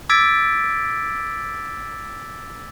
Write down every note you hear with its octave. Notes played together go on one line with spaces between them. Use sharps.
D6 E6 G#6 A6 B6 D7